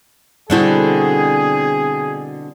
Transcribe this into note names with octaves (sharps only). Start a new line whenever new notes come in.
B2 D3 G3 C4 E4 G#4